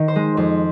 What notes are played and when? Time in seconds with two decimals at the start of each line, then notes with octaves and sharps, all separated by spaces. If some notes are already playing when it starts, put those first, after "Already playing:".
Already playing: D#3 D#5
0.08 C5
0.16 G#3
0.37 F2 C5